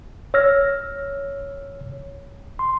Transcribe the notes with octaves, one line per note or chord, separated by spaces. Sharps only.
C#5 E6 F6 A#6
C6